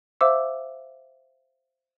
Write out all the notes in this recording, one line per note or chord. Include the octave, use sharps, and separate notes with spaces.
C5 E5 F5 D6 E6